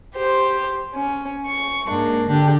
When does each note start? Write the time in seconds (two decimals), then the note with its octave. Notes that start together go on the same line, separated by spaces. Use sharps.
0.15 G4 C5
0.94 C#4
1.45 C#6
1.86 G#2 A#3 D4
2.28 D3 D4 G4